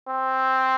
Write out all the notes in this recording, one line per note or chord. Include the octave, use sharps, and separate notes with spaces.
C4